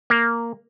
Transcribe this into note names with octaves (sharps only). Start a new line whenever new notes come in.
A#3